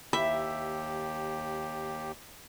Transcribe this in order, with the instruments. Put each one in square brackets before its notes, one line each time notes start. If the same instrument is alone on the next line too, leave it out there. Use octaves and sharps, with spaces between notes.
[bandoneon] D#2 G4 [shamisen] E4 [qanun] E5